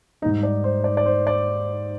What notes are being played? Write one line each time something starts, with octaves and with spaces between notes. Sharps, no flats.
G#2 G3 D#4
D5
C5
D5
D5
C5
D5